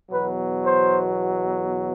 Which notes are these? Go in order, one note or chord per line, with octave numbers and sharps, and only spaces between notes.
E2 B2 F#3 B4
C5